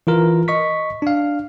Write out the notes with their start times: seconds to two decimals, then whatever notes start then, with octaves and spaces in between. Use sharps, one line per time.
0.07 E3 F4 A#4
0.48 D#5 C#6 B6
1.02 D4 F5